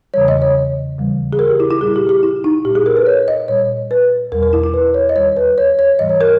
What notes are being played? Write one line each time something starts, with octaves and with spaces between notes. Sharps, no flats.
E2 C#3 E3 G3 C#5
D#5
C#5
D#2 C#3 E3 G3
G#4
A#4
G4
E4
E4
A#2 G3 G#4
G4
G4
E4
D#4
A#2 G3 G4
G#4
A#4
B4
C#5
D#5
A#2 G3 C#5
B4
E2 B2 G3 A#4
A#4
E4
E4
B4
C#5
D#5
D#2 D#3 G3 C#5
B4
C#5
C#5
G#2 E3 G3 D#5
C#5
A#4